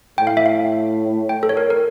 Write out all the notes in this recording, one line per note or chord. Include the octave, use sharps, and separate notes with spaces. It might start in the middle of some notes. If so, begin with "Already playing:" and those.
A2 G5
F5
E5
F5
G5
A4
C#5
A#4
A#4